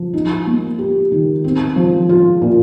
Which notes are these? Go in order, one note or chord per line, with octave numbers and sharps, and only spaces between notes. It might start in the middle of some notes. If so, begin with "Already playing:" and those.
Already playing: F3
D#4
A#3
G4
D#3
C4
F3
F4
A#2